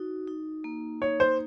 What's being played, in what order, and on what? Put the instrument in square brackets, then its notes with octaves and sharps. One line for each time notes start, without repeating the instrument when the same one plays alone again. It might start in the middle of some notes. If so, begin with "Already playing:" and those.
Already playing: [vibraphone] D#4 F#4
D#4
A#3
[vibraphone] D#4 [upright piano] C#5
[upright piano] C5